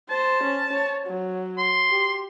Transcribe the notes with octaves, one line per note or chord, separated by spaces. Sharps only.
C5 A5
C#4
C#5
F#3
C6
G4